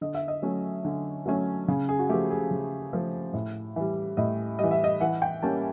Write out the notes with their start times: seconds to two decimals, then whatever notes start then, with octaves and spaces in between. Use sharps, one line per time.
0.01 D3 D#5
0.15 E5
0.28 D#5
0.42 F#3 A3 C#4
0.85 D3
1.26 F#3 A3 C#4
1.68 C#3
1.89 G#4
1.99 F#4
2.09 F3 A3 G4
2.31 G#4
2.51 C#3
2.93 F3 A3
3.33 A2
3.76 E3 G3
4.17 A2 D#5
4.59 E3 G3 D#5
4.71 E5
4.84 D#5
5.01 E3 F#5
5.22 G5
5.42 G3 A#3 C#4 A5